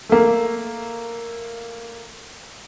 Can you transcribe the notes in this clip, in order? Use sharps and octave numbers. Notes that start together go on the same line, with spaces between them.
A3 A#3